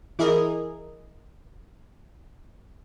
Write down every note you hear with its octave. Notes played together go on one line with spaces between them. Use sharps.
E3 E4 G#4 A#4 D#5